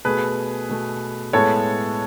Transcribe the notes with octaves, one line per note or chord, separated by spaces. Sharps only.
B2 A3 G#4 B4
B2 A3
A2 G#3 B3 A4 C#5